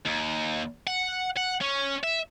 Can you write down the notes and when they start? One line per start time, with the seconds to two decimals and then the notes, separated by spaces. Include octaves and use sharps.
0.06 D#2
0.87 F#5
1.37 F#5
1.61 C#4
2.04 E5